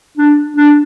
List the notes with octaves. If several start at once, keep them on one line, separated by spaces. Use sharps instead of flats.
D4
D4